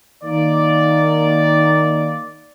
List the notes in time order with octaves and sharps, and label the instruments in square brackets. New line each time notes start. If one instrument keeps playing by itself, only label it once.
[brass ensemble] D#3 A#3 D5